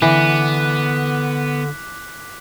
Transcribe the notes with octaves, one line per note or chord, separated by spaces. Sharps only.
D3 E3 B3 D6 F#6 B6